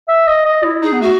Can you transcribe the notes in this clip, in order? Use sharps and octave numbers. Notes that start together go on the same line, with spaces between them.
E5
D#5
D#5
E4
D#4 G#4
B3
A3 F#4